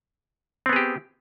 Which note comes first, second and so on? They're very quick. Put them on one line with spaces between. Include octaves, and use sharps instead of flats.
C4 B3 G#4 G4